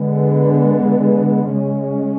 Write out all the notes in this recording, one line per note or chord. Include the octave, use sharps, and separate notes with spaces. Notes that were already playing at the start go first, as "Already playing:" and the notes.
Already playing: D3 G#3 B3
C#3 G#3 C#4